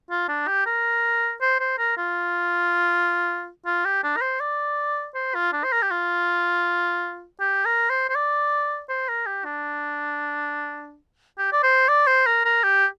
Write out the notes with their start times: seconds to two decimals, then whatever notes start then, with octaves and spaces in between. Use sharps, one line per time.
0.11 F4
0.29 D4
0.47 G4
0.66 A#4
1.41 C5
1.60 C5
1.79 A#4
1.97 F4
3.66 F4
3.85 G4
4.04 D4
4.17 A#4
4.22 C5
4.40 D5
5.15 C5
5.35 F4
5.53 D4
5.64 C5
5.73 A#4
5.82 G4
5.91 F4
7.40 G4
7.65 A#4
7.90 C5
8.10 C5
8.15 D5
8.89 C5
9.09 A#4
9.26 G4
9.45 D4
11.39 G4
11.53 D5
11.64 C5
11.89 D5
12.07 C5
12.26 A#4
12.45 A#4
12.64 G4